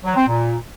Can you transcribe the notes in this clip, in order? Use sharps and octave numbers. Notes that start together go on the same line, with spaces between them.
F#3
C4
A#2